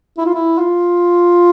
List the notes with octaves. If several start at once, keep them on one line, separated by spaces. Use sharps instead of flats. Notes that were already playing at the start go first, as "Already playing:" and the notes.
E4
F4
E4
F4